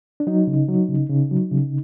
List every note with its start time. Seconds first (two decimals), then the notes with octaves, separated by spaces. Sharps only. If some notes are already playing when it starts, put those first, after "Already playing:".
0.20 D4
0.27 F#3 D#4
0.47 C#3
0.68 F#3
0.89 C#3
1.10 C#3
1.31 F#3
1.52 C#3